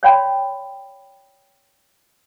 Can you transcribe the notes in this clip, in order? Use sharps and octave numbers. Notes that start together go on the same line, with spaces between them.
C#5 D5 F5 G5 B5 C6